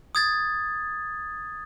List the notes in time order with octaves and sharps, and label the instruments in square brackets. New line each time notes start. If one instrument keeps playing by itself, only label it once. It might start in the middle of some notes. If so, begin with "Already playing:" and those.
[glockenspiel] D#6 G#6 A6